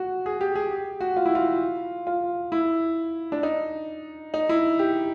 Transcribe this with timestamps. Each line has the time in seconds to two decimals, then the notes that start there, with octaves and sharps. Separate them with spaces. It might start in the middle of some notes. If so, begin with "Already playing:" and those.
Already playing: F#4
0.26 G#4
0.41 G4
0.56 G#4
0.71 G4
1.01 F#4
1.16 F4
1.25 E4
1.35 F4
2.07 F4
2.52 E4
3.32 D4
3.43 D#4
4.34 D#4
4.49 E4
4.79 G4